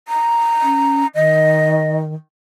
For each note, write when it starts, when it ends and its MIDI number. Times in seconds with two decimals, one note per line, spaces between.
0.08 1.07 82
0.63 1.04 61
1.15 2.14 51
1.15 1.95 75